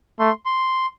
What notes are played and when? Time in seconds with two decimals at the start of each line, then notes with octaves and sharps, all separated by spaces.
0.19 A3 C6
0.46 C6